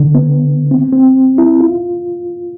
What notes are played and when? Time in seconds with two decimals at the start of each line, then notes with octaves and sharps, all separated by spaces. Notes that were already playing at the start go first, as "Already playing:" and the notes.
Already playing: D3
0.15 B3
0.71 C4
0.93 C4
1.38 E4
1.61 F4